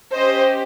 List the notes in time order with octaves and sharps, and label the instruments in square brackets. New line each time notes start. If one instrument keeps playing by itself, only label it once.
[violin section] C#4 G4 C5 D#5